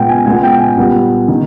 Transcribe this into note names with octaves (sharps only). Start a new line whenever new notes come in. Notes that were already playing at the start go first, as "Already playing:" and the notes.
Already playing: A#2 G#3 B3 G5
G#5
A#2 G#3 B3 G#5
G5
G#5
A#2 G3 B3
D#3